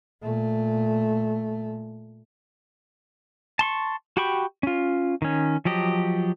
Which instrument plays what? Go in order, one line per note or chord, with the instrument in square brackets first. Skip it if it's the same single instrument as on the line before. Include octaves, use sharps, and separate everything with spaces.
[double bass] A#2 A3
[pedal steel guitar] A5 C6 C#6
F#4 G4 G5 B5 C#6
C#4 F4
D#3 C#4
F3 F#3 G4 D#5